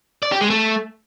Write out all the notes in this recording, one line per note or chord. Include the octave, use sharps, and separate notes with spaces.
D5
G4
G#3
A3